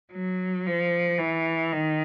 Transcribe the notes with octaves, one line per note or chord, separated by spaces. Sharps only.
F#3
F3
E3
D#3